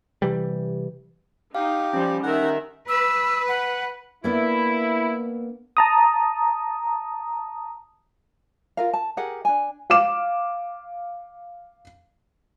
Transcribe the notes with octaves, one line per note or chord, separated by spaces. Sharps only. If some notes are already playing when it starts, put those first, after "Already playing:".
C3 E3 G3
D#4 G4 F5
F3 G3 C#4
D#3 A#4 E5 F#5
B4 E6
F#5
A#3 B3 D4 E4
A5 A#5 D#6
F4 A#4 F5
A5
G4 G#4 A#4 F#5
D4 G#5
F5 D6 E7